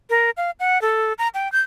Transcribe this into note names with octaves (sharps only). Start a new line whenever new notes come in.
A#4
F5
F#5
A4
A#5
G5
G6